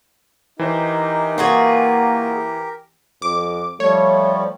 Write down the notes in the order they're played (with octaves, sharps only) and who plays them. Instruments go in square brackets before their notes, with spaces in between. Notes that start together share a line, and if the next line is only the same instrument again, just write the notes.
[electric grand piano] E3 C5 [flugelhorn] D#4 [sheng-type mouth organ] G4 A#4
[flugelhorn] A#3 [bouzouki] F4 F#4 G#4
[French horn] F2 [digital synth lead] D6
[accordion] F3 G3 [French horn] A3 [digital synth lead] C#5